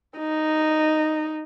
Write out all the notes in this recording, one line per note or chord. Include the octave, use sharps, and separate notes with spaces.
D#4